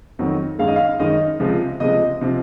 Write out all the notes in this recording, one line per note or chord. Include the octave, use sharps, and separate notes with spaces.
F2 D#3 F#3
F#2 D#3 G#3 F5
D#5
F5
F#2 D#3 G#3 D#5
C#2 C3 F3 G#3
C#2 C3 F3 G#3 D#5
C3 F3